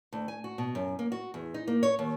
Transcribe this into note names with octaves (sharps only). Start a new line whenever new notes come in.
D2
G#5
F#4
B2
F#2
A#3
F#4
E2
D#4
A#3
C#5
D#2